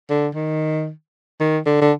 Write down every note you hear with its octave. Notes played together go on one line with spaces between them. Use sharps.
D3
D#3
D#3
D3
D3